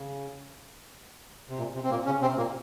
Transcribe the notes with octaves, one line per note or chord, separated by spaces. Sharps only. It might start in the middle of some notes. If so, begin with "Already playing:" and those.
Already playing: C#3
C3
A#2
C3
C4
A#2 A#3
C#3 C#4
C3 C4
A#2 A#3